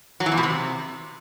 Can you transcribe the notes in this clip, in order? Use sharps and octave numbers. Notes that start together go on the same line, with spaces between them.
F#3
E3
E2
B2
C3